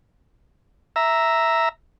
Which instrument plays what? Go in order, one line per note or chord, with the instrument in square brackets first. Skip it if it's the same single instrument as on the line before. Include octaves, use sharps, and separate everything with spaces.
[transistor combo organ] E5 A#5